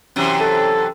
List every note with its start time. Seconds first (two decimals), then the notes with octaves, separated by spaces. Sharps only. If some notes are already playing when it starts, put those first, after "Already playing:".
0.16 F#2 C3 E3
0.40 A4